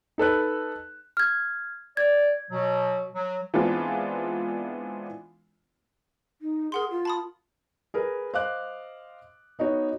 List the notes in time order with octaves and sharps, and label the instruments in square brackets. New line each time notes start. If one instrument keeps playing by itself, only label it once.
[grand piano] D#4 A4 B4 F#6
[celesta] F6 G#6
[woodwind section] D5 [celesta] G#6
[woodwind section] B2 F#3
F#3
[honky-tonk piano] E3 G#3 B3 C4 D4 F4
[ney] D#4
[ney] G#4 [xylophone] A#4 F#5 C6
[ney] F4
[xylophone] A5 B5 D#6
[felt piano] G#4 A#4 B4
C5 D#5 F5 D6 F#6
B3 D#4 F#4 C#5